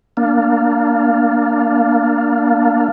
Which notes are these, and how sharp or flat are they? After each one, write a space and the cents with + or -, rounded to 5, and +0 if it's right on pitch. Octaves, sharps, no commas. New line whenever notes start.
A#3 +0 D4 +0